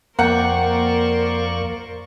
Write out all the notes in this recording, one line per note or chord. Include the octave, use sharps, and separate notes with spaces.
F2 A#3 A#4 C5 D5 F#5 G5 C#6